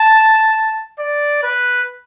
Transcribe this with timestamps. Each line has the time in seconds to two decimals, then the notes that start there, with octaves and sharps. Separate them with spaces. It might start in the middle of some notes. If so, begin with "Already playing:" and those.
Already playing: A5
0.99 D5
1.43 B4